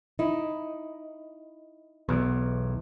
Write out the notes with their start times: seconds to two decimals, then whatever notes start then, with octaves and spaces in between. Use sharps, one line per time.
0.19 D#4 E4
2.09 B1 E2